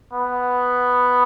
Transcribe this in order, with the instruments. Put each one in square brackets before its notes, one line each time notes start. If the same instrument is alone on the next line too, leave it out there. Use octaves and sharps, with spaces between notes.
[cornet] B3